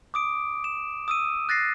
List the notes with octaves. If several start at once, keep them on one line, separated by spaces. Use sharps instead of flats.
D6 D#6 D7
E7
D#6 E6 D#7
F#6 A6 A#6 C7